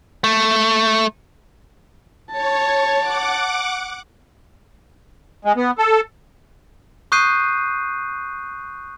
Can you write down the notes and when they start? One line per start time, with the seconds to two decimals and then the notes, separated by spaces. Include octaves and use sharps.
0.24 A3
2.32 C#5 A5
2.98 F#5 D6
5.45 G#3
5.56 B3
5.78 A4
7.12 C#6 D#6 F#6 G6 C7 D#7